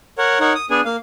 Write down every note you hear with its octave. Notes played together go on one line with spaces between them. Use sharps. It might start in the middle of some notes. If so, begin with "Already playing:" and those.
A#4 C#5 F#5
D#4 A#4 C#5 F#5
D#6
B3 D4 G#4 G#5
A#3 F5